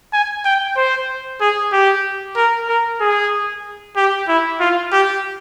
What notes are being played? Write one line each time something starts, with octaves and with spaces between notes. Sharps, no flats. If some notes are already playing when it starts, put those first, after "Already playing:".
G#5
G5
C5
G#4
G4
A#4
A#4
G#4
G4
E4
F4
G4